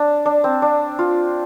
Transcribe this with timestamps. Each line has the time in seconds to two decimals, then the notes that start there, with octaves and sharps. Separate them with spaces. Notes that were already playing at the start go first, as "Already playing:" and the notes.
Already playing: D4
0.26 D4
0.44 C4
0.62 D4
0.99 F4